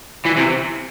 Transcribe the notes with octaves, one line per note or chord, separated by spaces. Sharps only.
E3
C3